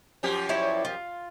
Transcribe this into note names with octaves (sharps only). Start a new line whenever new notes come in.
F#2 F3 G4
E4 C#5 D5
F4